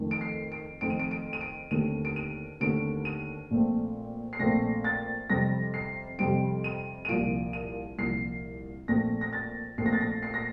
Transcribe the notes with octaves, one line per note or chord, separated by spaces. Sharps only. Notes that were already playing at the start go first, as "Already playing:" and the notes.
Already playing: F2 D#3 A3 C4
D7
C7
D7
F2 D#3 A3 C4 D7
D#7
D7
D7
D#7
D7
D#2 D3 A3 C4 D#7
D7
D#7
D#2 D3 A3 C4 D7
D#7
A#1 A#2 A3 C4
C7
A#1 A#2 A3 C4 A#6
A6
F2 C3 G3 C4 A#6
C7
F2 C3 G3 C4 D7
D#7
D#7
C2 A#2 F3 D7
D#7
C2 A#2 F3 C7
A#1 A#2 A3 C4 A#6
A#6
A6
A#1 A#2 A3 C4 C7
A#6
A6
A#6
C7
A#6